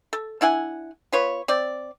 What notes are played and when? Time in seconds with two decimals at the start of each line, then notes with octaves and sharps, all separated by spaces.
0.13 A4
0.41 D4 E4 F#5 G#5
1.12 B3 F4 B4 C#5
1.48 C4 D5